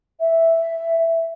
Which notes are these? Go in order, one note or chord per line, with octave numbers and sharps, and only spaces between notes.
E5